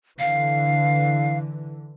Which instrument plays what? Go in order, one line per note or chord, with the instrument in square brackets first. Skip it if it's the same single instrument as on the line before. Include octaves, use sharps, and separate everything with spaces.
[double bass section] D3 E3 [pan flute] F5